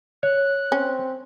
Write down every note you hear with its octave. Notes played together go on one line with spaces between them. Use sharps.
C#5 F#6
C4 C#4